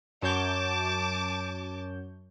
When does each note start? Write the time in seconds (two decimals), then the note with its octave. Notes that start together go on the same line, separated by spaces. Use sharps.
0.22 F#2 C#5 A5 D6 G6